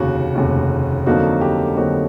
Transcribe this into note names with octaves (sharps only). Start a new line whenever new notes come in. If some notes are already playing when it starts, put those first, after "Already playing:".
Already playing: F1 D#2 C#3 F#4
F1 D#2 C#3
F2 D3 F#3 A#3 D#4 F#4
G4
F2 D3 F#3 A#3 D#4 F#4